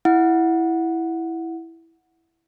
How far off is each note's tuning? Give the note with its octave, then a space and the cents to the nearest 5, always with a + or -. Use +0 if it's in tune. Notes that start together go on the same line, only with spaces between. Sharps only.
E4 +0 F#5 -10